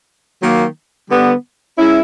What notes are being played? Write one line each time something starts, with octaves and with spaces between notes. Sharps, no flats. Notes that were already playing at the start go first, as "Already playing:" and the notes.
D#3 F#3 A#3
D3 G3 B3
G#3 C#4 E4